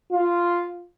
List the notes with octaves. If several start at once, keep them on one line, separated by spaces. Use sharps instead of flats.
F4